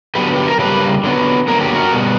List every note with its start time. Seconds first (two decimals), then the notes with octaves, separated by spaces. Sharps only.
0.15 D3 F#3 B3 G4 B4
0.36 G4
0.48 A#4
0.59 C#3 G3 A#3 G4 B4
1.03 D3 F#3 B3
1.48 D3 F#3 A#3 A#4
1.61 G4
1.74 F#4 A#4
1.92 B2 G3 B3